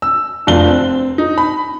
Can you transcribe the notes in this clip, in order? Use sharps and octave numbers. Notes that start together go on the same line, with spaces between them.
E6
F1 D4 F4 G7
C4
D#4
B5